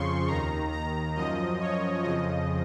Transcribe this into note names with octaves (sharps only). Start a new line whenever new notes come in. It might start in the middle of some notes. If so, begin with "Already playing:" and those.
Already playing: F2 C#3 F3 C6 C#6
D#2 D#3 A#5
A#5
F#2 F3 D#5
C#5
F2 C#3 F3 D#5